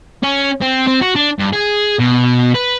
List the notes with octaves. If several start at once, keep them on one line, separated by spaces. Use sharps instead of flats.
C#4
C4
C4
F#4
D4
G2
G#4
B2
B4